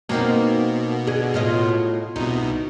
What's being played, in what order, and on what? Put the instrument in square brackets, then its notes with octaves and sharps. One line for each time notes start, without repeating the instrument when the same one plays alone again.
[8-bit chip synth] B2 [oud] A#3 C4 D#4
[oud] D3 G#4
A2 F4 D#5
[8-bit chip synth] C2 B2 [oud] D#4